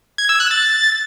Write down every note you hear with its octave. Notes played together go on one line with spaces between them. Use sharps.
G#6
E6
F#6
A6